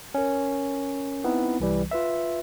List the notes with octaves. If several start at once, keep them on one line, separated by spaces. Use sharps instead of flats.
C#4 A#4
B3 C4 D#4 E4
C2 E3 G3
F4 B4 E5